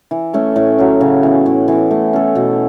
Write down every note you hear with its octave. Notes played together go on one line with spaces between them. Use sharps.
E3
A3 C#4 A4
A2
F#3 C#4
C#3
E3 B3
A2
E3 B3
A3
C#4 A4
B2